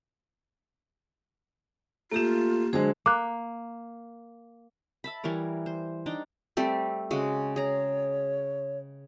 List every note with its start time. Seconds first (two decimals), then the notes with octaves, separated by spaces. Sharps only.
2.12 A3 A#3 F4 G4 E7
2.73 D3 F#3 G#3 G#4 C5
3.06 A#3 D6 F#6
5.04 E5 A5 B5
5.24 E3 G3 A#4 C#5
5.66 C5
6.06 D4 D#4 G5
6.57 G3 A3 C4
7.11 C#3 G#3 F#4
7.56 G#4 C#5 A#5